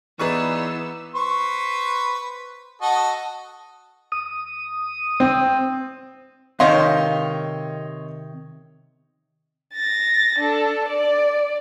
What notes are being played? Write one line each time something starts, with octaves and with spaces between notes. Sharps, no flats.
E3 B3 D#4 G#4 B4 D5 C#6 E6
B4 C5 C#6
F#4 A4 D#5
D#6
C4
C3 D#3 C#5 D#5 F5 C6
A6 A#6
D4 A4
D5